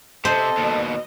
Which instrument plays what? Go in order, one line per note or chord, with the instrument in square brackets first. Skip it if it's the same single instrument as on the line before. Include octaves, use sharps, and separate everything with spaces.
[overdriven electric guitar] C3 [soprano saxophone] A4 [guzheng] C5 [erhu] D#5
[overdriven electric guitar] D#2 B2